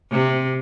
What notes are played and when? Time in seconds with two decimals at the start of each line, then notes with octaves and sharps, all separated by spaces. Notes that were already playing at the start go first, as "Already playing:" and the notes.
0.11 C3